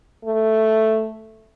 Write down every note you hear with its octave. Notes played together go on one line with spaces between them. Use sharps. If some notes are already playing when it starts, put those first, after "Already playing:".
A3